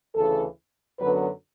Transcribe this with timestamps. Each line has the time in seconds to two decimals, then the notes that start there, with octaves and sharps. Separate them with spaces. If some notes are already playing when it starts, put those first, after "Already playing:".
0.16 D2 C#3 E3 A4
0.99 F#2 D3 F#3 B3 B4